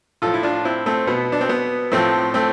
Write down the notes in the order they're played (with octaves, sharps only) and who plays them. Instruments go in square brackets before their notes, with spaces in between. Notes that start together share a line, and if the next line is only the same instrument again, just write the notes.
[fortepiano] A2 F3 F4 A4
E4
D4 F4
C4 E4
A3 C4
B2 B3
D4
C4
B3
A2 F3 A3 C4
A3 C4